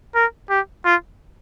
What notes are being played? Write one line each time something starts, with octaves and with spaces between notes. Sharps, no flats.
A#4
G4
F4